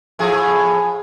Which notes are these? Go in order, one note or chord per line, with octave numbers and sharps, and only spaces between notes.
A2 F3 G#4